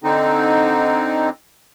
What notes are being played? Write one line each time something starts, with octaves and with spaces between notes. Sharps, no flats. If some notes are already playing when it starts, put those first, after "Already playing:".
D3 C4 D#4